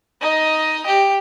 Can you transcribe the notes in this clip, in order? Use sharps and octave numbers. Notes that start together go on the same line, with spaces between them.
D#4 D#5
G4